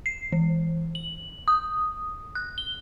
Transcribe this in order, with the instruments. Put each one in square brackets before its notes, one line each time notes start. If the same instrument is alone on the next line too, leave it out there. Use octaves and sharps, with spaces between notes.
[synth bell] C7
E3
F#7
D#6
F#6
G7